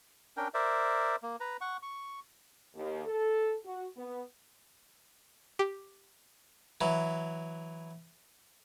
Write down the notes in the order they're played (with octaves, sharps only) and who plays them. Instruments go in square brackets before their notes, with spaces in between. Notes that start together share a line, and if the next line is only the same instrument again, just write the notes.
[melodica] C#4 D4 A#4 G5
A#4 C5 D5 E5
A#3
B4 A#5
F#5 C#6
C#6
[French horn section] D#2
A4
F#4
B3
[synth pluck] G4
[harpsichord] E3 F#3